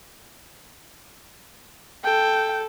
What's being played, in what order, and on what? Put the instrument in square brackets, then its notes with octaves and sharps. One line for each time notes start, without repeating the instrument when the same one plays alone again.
[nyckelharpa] A4 [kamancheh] G5